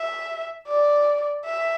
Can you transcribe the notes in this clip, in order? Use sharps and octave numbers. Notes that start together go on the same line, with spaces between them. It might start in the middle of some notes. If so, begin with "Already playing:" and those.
Already playing: E5
D5
E5